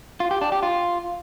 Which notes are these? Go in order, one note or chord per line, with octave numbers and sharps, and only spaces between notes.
F4
G4
D4
G4
F4